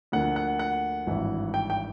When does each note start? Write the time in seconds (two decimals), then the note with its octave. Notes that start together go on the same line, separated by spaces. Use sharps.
0.12 D2 D3 F3 A#3 F#5
0.36 F#5
0.59 F#5
1.07 G#1 G2 E3
1.54 G5
1.70 G5